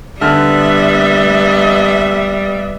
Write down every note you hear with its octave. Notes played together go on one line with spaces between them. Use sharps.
D3 G3 B3 E5 F6